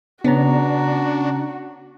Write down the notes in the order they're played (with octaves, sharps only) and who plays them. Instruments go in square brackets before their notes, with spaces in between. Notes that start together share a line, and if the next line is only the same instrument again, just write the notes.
[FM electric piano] C#3 C#4 A#5 [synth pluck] B3 [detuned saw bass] D4 [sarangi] F#4